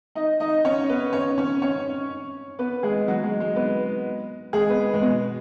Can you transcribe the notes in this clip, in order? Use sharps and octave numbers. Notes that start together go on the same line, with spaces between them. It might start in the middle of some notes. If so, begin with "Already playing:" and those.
D#4 D#5
D#4 D#5
C#4 C#5
B3 B4
C#4 C#5
C#4 C#5
C#4 C#5
B3 B4
G#3 G#4
F#3 F#4
G#3
G#3
B3 B4
G#3 G#4
B3 B4
G#3
B2 B3